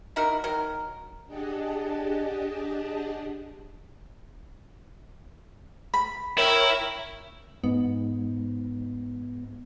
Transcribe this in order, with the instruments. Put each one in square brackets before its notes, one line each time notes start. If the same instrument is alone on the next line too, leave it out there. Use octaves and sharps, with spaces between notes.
[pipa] D#4 E4 F#4 A#4
D#3 F#3 A#4
[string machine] D4 G4 G#4 D#5 F#5 A5
[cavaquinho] B5
[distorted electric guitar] E4 [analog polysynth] A#4 C#5 G5
[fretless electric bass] G#2 [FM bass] B3